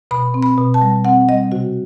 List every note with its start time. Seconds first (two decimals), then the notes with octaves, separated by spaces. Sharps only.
0.11 B2 B5
0.34 C4
0.43 B5
0.58 B2
0.74 A5
0.82 G3
1.05 C4 F#5
1.28 G3 D#5
1.52 C3 F#4